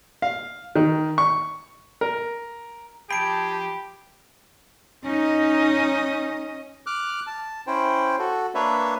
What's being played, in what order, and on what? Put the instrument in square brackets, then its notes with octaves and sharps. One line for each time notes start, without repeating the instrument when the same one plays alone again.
[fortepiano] F5
D#3
C#6
A#4
[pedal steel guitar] F3 G#4 G5 [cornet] G4 [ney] A5 [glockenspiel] B5 D7
[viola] C#4 D#5 [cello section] D#4
[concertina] D6 F6 F#6
A5
C#4 E4 C5 G5
F#4 A4
A#3 D4 B4 C#5 E5